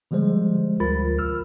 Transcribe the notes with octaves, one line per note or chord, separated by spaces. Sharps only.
D3 F3 G3 G#3 C5
D2 F4 A#4 B5 A6
C2 E6 F6